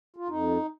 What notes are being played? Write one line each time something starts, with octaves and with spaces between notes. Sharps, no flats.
F4
F2 D#4